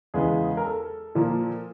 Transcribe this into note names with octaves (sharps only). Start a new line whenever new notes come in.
E2 C#3 E3 G#3 B3 G#4
A#4
A4
A#2 F3 A#3